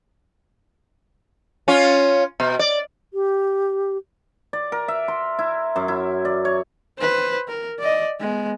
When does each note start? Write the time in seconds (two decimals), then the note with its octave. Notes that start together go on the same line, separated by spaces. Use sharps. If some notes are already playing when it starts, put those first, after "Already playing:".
1.68 C#4 F4
2.40 B2
2.59 D5
3.14 G4
4.53 D5
4.72 A#4
4.88 E5
5.08 C6
5.39 E4
5.76 F#2
5.88 E4
6.25 D5
6.45 C#5
6.98 B4 C5
7.48 A#4
7.79 D5 D#5
8.20 G#3 B3